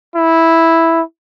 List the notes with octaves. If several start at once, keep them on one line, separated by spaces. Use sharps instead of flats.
E4